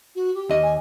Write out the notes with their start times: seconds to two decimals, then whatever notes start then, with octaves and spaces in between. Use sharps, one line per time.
0.15 F#4
0.34 G4
0.49 D#2 D#5
0.62 G#5